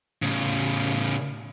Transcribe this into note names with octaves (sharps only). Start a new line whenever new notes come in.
A2 C#3